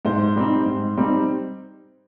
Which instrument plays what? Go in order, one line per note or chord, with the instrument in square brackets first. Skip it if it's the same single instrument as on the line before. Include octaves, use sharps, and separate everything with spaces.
[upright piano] G#2 C5
G3 C4 D#4
G#2
G3 C4 D#4